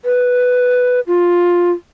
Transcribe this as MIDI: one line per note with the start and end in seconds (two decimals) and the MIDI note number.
0.05 1.00 71
1.07 1.71 65